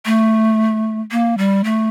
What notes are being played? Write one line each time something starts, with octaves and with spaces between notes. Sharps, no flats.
A3
A#3
G3
A3